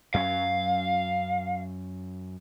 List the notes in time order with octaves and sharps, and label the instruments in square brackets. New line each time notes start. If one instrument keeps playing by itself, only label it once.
[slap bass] F#2 F#3 C#4 [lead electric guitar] F5